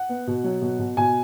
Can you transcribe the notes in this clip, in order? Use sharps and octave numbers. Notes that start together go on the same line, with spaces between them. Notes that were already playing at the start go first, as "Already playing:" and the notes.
Already playing: F#5
B3
B2
F#3
B2
B2
B2 G#5